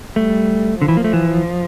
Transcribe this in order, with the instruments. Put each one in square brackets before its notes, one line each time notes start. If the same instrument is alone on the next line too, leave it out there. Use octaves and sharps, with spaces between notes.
[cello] G3 [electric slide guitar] A3
[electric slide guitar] D3 [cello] F3
[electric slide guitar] E3
A#3
A3
E3